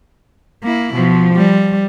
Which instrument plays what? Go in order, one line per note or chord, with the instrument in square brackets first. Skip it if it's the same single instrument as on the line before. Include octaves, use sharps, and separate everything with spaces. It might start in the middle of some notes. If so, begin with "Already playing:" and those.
[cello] A#3 E4
[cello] B2 [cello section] F3
[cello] G3